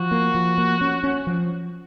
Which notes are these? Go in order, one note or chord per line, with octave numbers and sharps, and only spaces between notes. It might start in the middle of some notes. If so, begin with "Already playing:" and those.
Already playing: F3 F#4
A#3
F3
A#3
C#4
C#4
F3